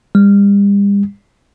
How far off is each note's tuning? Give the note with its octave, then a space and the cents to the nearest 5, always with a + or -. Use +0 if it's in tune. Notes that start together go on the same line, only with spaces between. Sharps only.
G3 +40